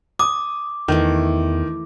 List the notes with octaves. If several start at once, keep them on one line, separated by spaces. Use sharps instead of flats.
D6 D#6
E2 D#3 E3 A3